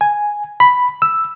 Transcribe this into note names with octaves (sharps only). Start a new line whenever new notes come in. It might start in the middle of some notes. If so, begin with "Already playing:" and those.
G#5
B5
E6